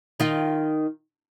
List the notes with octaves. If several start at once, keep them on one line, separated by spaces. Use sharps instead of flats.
D#3 F4